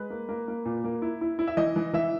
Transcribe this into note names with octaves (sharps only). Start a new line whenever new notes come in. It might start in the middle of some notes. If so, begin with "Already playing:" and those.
Already playing: G#3 B4
A#3
A#3
A#3
A#2
A#3
E4
E4
E4
E5
E3 D#5
E3
E3 E5